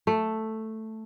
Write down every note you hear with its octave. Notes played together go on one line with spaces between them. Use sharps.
A3